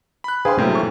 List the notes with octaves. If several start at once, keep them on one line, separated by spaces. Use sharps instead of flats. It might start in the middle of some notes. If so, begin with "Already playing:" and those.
B5 F#6
D4 G#4 B4 C5 F5 G5 C6
A1 C3 F#3 A3 A#3 E4 G5
C#6